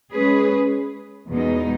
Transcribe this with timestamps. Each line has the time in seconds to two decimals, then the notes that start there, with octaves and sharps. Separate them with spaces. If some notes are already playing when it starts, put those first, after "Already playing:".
0.12 G#3 C#4 G#4 B4
1.30 E2 B2 G#3 D#4